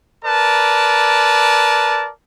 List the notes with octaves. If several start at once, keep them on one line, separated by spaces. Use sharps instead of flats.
A#4 B4 D5 A5